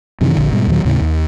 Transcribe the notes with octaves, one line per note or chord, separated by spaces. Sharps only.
F#2 C3 D#3 E3
E1 A#1 D3
G#2 B2 G3
D#2 A#2 D#3 F#3
D#2 A2 C#3
D#2